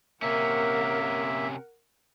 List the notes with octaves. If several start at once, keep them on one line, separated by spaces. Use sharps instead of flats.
C3 A#3 C#4 A#4 E5 F#5